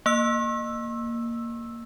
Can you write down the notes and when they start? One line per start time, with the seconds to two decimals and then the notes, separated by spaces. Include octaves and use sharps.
0.06 A#3 E6